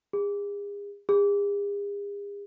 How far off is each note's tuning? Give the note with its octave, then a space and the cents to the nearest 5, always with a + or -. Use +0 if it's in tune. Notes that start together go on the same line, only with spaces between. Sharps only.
G#4 -40
G#4 -45